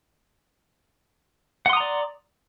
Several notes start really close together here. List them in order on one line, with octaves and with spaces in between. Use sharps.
F#5 C6 D#6 A#5 D5